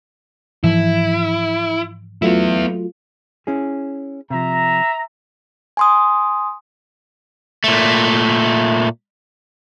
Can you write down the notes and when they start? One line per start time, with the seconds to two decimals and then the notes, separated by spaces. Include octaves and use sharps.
0.64 G#2 E3 F3 E4
2.22 F#3 A3 B3 E4 F4
3.47 C#4 E4 G#4
4.30 C3 F3 E5 A#5
5.77 G#5 C6 D#6
7.64 A#2 A3